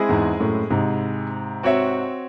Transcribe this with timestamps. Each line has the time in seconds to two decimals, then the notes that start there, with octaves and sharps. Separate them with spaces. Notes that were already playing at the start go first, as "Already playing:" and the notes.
Already playing: G#3 C4 E4 G#4 D#5
0.09 E2 G#2
0.40 F#2 A2
0.71 G#2 C3
1.63 C4 F#4 C#5 E5